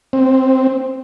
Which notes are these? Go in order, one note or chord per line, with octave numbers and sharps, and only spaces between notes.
C4